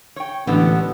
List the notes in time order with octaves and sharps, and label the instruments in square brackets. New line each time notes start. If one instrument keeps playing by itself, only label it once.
[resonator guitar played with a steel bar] C#5 G5
[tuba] A1 [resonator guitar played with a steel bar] D3 G#3 [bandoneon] B3